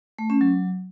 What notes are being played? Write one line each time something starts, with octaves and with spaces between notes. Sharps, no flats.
A3
C#4
F#3